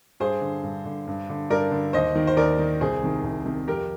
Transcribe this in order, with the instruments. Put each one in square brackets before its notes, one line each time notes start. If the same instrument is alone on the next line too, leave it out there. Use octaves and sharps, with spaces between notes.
[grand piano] G2 G#4 C5
D3
G2
D3
G2
D3
G2 A#4 D5
D3
D#2 C5 D#5
D#3
C5
D#2 A#4 D5
D#3
C2 G#4 C5
C3 D#3
C2
C3 D#3
F2 G4 A#4